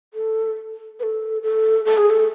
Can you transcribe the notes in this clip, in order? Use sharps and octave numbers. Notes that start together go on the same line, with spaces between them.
A4
B4
A4
A4
A4
G#4
A4